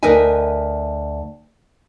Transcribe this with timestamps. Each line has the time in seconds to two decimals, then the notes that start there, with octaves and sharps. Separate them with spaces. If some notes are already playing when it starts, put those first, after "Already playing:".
0.03 D2 A#4 B4 D#5 E5 G#5